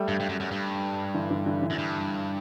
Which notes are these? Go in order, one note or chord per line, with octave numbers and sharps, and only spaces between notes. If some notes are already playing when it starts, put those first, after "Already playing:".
Already playing: G3 A3
G2
G2
F#2
F#2
G2
D3 E3
D3 E3
D3 E3
D3 E3
F#2
G2